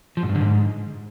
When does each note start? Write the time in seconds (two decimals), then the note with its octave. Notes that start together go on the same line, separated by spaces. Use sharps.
0.17 F3
0.23 G#2
0.29 G2
0.35 D3
0.41 G#2